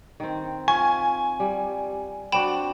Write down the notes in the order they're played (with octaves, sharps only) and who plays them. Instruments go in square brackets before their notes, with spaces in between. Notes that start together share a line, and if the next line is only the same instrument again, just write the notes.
[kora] D#3 C4
[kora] F4 [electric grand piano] G#5 [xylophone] C#6
[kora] G3
[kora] C4 D4 F#4 [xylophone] G5 B5 E7